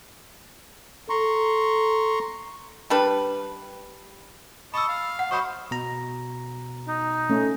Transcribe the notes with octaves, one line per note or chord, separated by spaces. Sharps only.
A4 A#5 C6 C#6
G3 D4 B4
D#5 A5 B5 C#6 E6
F5
F#5
F#3 C5 D#5 B5 C#6
B2 A#5
D#4
A3 C#4